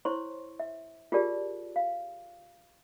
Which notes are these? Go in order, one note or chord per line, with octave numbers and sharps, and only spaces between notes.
E4 C5 C#5 C6 C#6
E5
F4 G4 G#4 A#4 D5 A5
F5